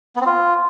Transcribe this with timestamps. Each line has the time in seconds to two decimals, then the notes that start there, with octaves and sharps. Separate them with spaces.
0.16 B3
0.21 C4
0.26 F4